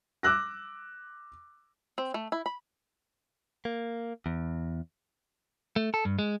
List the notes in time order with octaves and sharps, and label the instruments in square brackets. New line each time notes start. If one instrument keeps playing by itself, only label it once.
[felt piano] D6 E6 F#6 A#6
[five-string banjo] C4
A3
E4
B5
[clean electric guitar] A#3
E2
A3
A4
G2
G#3